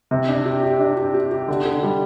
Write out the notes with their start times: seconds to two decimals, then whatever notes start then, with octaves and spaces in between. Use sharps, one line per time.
0.11 C3
0.28 D4
0.45 G4
0.63 G4
0.80 D4
0.97 G4
1.14 G4
1.31 G4
1.48 D3
1.65 D3
1.83 G3